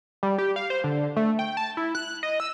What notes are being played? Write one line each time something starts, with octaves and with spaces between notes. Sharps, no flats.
G3
G4
F5
C5
D3
A3
G5
A5
E4
F#6
D#5
E6